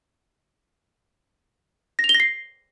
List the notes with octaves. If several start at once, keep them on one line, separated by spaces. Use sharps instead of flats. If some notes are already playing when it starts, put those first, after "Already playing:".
A#6
F7
G7
A#6
C7